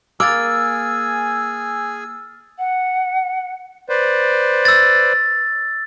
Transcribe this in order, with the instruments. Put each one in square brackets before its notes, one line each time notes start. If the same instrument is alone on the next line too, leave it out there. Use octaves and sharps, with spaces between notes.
[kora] A#3 [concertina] G#4 G#5 [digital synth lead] E6 [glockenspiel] F6 A6
[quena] F#5
[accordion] B4 C5 D5
[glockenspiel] E6 A6